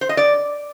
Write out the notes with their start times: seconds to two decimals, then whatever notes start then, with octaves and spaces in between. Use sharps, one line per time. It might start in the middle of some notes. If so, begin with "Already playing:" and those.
0.01 C5
0.09 D#5
0.17 D5